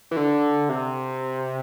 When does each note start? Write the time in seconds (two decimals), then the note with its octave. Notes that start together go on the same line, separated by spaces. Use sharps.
0.11 E3
0.17 D3
0.69 C3